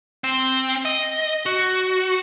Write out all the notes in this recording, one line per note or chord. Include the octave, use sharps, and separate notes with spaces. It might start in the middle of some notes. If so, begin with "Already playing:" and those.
C4
D#5
F#4